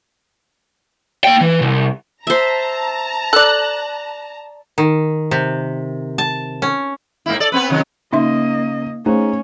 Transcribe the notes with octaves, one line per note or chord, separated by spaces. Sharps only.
A#3 G5
E3
C2
C5 E5 A5 A#5
A4 D5 F#6
D#3
C3
A5
C#4
G#2 A#3 E4
A4 D5
B3 C4 B4
C3 D#3 F#3
C#3 A#3 D#4 D#5 E5 C6
A3 C#4 D#4 G#4 C5